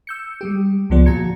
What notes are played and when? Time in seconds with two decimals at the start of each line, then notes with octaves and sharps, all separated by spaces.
0.07 E6 G6 C#7
0.41 G3 G#3 G4
0.90 C#2 D3 F3 B3 D5
1.06 A#2 F#4 A5 A#5 G#6 C#7